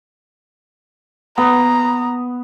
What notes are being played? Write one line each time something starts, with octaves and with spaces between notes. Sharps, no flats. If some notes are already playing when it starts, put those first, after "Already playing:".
B3 A#5